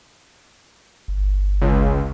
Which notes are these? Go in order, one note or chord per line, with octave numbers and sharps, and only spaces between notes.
G1
C#2